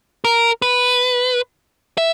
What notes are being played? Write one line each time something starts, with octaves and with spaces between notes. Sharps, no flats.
A#4
B4
E5